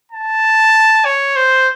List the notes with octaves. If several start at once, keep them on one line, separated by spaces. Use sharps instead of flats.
A5
C#5
C5